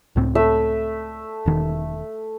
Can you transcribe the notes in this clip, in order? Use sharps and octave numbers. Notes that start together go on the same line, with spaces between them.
C#2 A2 C4
A3 E5
E1 D#3